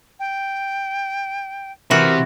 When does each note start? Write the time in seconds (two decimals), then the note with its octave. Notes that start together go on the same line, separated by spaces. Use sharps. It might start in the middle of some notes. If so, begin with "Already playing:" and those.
0.20 G5
1.91 C3 E3 F#4 A#4